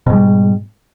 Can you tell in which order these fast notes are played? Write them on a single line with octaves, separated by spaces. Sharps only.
B2 G#2 G3